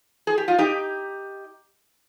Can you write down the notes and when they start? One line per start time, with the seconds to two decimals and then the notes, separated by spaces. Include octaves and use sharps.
0.27 G#4
0.38 G4
0.48 F4
0.58 D#4 G4